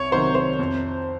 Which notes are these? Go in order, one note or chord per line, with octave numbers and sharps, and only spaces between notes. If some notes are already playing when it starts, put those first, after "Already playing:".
Already playing: C2 C#5
C3 D#3 F#3 C5
C5
F2